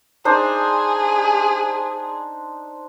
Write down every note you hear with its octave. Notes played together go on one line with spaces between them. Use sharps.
D4 D#4 G#4 C5